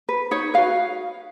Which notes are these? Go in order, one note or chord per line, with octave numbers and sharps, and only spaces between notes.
B4
D#4 C#5
F#4 B4 F5